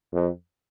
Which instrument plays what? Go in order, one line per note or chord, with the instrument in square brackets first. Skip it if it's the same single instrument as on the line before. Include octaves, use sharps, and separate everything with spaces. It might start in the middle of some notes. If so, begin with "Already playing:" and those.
[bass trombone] F2